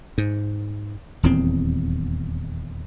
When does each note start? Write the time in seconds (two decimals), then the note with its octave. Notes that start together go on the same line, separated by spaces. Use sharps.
0.18 G#2
1.23 D#1 E2 C4